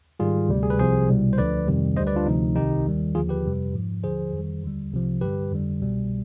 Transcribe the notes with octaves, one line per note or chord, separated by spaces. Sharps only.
G#2 D#3 G3 F4 G#4
D2 C3 G3
G#4
B4
C2 C3 F3 G#4 C5
C2 B2 G3
C5
D2 D3 F3 B4 D5
F2 C3 D#3 G3
D2 D3 G3 C5 D#5
B4 D5
D4 F4
D2 C3 F3 D#4
C2 C3 D#3 D#4 G4
D#2 D#3 G3
D#2 D3 F3 F4 G#4
G4 B4
F2 C3 G3
G#2 F3
D#2 D3 F3 G#4 C5
F2 D#3 G3
D#2 D3 G3
C2 C3 F3
G2 D3 G3 G4 B4
F2 D3 G3
C2 B2 G3